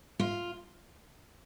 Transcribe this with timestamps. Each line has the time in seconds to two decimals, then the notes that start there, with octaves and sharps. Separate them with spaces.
0.20 F4